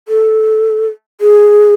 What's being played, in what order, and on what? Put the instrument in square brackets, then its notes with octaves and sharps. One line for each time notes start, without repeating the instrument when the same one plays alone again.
[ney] A4
G#4